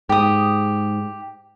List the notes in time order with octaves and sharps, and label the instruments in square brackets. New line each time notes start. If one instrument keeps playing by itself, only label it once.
[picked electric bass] G#2 [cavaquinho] G4 D#6